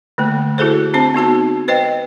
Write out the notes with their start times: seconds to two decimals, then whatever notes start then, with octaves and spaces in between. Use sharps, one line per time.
0.18 D3 A3 A#3
0.58 E4 F#4 G#4 A4 C5
0.94 C4 D4 C5 A5
1.14 B3 D#4 F#4 A5
1.68 B4 C5 D#5 G5